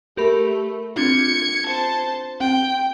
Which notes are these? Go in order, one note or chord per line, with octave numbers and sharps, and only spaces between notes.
A3 G4 A#4 B5
C4 D4 F4 G#6 C#7
C5 A5
C4 G5